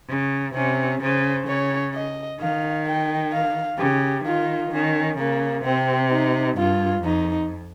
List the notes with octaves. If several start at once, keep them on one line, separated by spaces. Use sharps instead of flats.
C#3
C3 C#4
C#3 C5
C#3 C#5
D#5
D#3 F5
G5
F5
C#3 G4
D#3 F4
D#3 C#4
C#3 A#3
C3 C4
D#4
G2 F4
F2 D#4